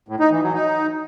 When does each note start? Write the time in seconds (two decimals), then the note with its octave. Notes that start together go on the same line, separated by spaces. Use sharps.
0.09 A2
0.20 D#4
0.31 E3
0.42 F#3
0.54 D#4